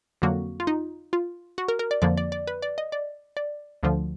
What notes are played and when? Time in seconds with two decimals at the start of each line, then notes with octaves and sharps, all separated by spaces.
0.22 F2 D3 F#3 A#3 F#4
0.60 F4
0.67 D#4
1.13 F4
1.58 F#4
1.68 A#4
1.79 A#4
1.91 D5
2.02 F2 D3 F3 A#3 D5
2.17 D5
2.32 D5
2.47 B4
2.62 D5
2.78 D#5
2.92 D5
3.37 D5
3.83 D2 D3 F3